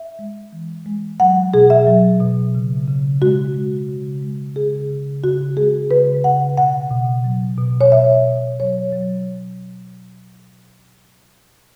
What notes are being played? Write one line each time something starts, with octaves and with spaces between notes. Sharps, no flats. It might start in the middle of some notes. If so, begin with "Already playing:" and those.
Already playing: E5
G#3
E3
G#3
F#3 F#5
B2 G#4
E5
F#3
B2
C#3
C#3
G#3 F#4
G#3
C#3
G#3
C#3 G#4
C#3
C#3 F#4
G#3 G#4
C#3 B4
C#3 F#5
B2 F#5
B2
F#3
B2
C#5
B2 E5
B2
F#3 C#5
F#3